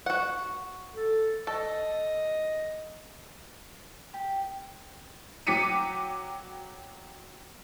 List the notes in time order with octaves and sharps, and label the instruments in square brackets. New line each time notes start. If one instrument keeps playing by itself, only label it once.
[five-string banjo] F#4 F#5
[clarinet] A4
[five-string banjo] A4 [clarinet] D#5
[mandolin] G4
[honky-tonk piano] F#3 G5 D6 B6 C#7 D#7